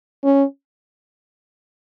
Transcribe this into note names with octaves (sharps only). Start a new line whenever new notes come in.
C#4